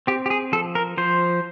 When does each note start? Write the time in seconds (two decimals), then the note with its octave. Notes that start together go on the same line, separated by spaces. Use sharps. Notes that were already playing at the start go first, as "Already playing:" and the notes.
0.07 C4 G4
0.26 G4
0.30 G#4
0.52 F3 A4
0.75 A#4
0.97 F3 C5